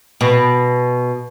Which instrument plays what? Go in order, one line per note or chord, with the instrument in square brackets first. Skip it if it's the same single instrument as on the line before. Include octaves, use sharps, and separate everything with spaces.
[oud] B2